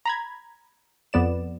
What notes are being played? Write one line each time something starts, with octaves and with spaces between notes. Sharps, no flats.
A#5 B5 G#6
F2 B3 D5 E7